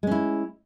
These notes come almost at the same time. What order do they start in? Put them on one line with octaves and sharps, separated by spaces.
G#3 C#4 E4